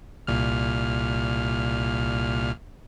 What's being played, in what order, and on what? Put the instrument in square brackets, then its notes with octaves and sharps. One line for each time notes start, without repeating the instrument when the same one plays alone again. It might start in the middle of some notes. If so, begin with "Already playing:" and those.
[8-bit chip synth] C2 A#2 F6